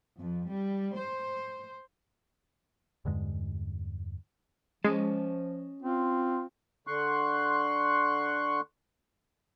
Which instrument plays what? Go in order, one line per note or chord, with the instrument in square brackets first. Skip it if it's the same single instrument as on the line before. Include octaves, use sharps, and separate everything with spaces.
[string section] F2
G3
C5
[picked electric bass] E2 G2 D3 G#3
[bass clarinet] F3 [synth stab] G#3 [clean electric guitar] C#4 D#5 A5
[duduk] C4 [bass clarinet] F4
[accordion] D3 C6 C#6 F#6